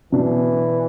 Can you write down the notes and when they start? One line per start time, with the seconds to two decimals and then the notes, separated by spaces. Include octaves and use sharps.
0.12 B2 E3 F#3 B3 D4